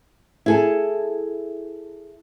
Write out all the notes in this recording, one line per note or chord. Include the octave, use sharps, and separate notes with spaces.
E4 G#4 A4